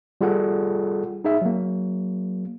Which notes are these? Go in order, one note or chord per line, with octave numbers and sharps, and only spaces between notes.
G3 F4 G#4 A4 F#5
D#4 G#4 E5
F#3 A#3